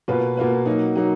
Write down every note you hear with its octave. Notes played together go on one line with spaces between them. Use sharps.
B2 A#3 F4 B4
B2 A#3 F4 B4
F#3 A#3 D#4
F#3 A#3 D#4